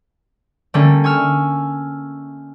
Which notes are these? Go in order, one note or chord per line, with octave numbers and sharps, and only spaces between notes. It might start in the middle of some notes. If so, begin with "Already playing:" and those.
D3 G3 A3 A#3 C#4
G#5 C#6 E6 F6